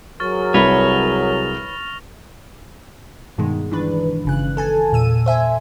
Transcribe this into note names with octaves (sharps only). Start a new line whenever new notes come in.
F#3 G#4 A#4 C#6 F6 A6
C2 B4 C#5 F6 A#6 F7
G2 B2 D#3 G#3
D#3 E3 D4 B4
G1 C#3 F#6
A4 G#5 A5
E2 A#2 E6 D#7
C5 E5 G#5